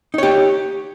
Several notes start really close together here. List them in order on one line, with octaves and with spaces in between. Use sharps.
D#4 C#5 G4